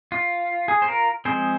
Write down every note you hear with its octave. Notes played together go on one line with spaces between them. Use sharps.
F4
G#4
C5
F4 A#4
F3 G#3 C4 G#4 C5